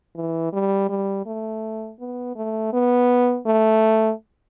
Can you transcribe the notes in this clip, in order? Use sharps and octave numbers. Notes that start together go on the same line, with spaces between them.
E3
G3
G3
A3
B3
A3
B3
A3